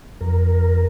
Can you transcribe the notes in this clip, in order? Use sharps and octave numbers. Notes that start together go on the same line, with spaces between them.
F2 A#4